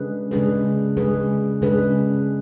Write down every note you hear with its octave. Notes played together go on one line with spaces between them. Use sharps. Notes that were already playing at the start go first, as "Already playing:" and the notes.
Already playing: C#3 G#3 D4 G#4 B4
C#3 G#3 D4 G#4 B4
C#3 G#3 D4 G#4 B4
C#3 G#3 D4 G#4 B4